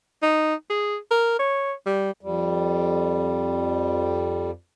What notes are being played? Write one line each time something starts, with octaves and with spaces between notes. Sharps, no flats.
D#4
G#4
A#4
C#5
G3
F2 G3